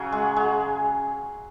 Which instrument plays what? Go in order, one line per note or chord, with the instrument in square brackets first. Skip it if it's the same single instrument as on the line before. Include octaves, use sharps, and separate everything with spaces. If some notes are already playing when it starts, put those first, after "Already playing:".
Already playing: [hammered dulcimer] C#3 F#3 C#4 F#4 G#4
G#3
G#3